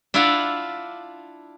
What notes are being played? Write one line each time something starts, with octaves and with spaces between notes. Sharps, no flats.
D4 E4 F4 D5 F5 F#5